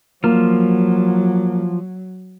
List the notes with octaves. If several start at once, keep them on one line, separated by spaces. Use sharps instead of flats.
F3 F#3 A#3 F4 F6